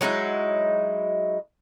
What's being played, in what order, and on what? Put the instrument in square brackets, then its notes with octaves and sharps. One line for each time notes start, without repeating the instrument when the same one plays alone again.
[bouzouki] F#3 G#3 D#4 E4